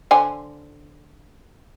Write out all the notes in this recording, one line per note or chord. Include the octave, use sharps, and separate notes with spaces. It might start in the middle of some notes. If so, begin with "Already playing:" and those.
D3 C5 G#5